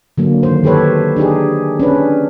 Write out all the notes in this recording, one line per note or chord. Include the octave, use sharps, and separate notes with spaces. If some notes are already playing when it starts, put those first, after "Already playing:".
D3 F#3 A#3
D#3 C5
D#3 G4 A4 B4 C#5
D4 D#4 G4 G#4
C#4 D4 B4